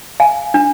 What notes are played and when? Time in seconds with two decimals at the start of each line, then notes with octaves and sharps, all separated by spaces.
0.20 F5 G#5
0.54 D4